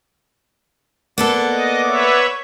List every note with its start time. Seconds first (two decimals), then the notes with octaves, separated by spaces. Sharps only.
1.18 A#3 B3 A4 D5 F#5 D6
1.50 D#5
1.87 B4 C#5 E5